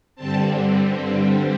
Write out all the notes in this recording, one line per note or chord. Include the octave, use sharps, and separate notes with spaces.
G2 D3 G3 C4 A5